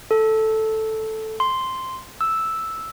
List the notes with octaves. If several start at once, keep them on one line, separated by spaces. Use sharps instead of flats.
A4
C6
E6